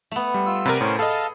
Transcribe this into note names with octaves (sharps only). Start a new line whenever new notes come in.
A3 B3
G3
F4 E6
C3 A#4 B4 D5 G#5
A2 C#4 A#4 C5
G#4 A4 D#5 F5 A5